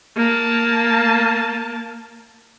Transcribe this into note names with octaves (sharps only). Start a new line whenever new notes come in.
A#3 A5